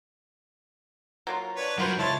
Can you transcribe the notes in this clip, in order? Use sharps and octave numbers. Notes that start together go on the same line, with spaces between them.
F#3 A#3 F4
D4 B4 C#5
G2 F#3 B3 F4 F#4 A#4 C5
C#2 E4 F4 C#5 A5 C6